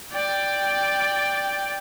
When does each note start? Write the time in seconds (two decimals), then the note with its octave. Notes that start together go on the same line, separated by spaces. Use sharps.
0.12 D5 G5